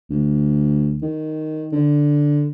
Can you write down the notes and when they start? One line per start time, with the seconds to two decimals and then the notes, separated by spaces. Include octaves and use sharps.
0.10 D2
1.02 D#3
1.73 D3